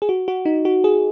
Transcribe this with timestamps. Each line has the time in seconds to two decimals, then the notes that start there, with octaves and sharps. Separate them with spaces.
0.02 G#4
0.09 F#4
0.28 F#4
0.45 D#4
0.65 F#4
0.84 G#4